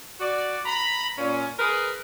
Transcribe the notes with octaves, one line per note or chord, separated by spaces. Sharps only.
F#4 D5
A#5 B5
A#2 C#4
G#4 A#4 B4